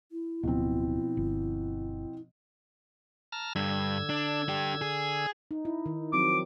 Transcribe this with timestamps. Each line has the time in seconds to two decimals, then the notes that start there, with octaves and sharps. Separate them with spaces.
0.12 E4
0.43 D1 B2 F3 C4
1.17 G1
3.32 A5 A#5 F6
3.56 G2 D3 E6 G#6
4.09 D4
4.48 D4 G4
4.81 G#4
5.51 D#4
5.65 E4
5.86 D#3
6.13 F3 F#3 C4 D6